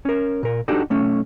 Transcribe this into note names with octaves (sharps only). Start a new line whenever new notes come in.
C#4 A#4
A#2 A#4
D4 D#4 F#4 G4 A4
B1 A3 C#4